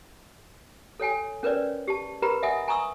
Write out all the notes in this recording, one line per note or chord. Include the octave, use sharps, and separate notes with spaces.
A4 C#5 G5 G#5
C#4 A#4 B4 C#5 D5
G4 A5
G4 A#4 B4 A#5 B5
D#5 E5 F#5 G#5 D#6
G#5 A#5 C6 C#6 D#6 E6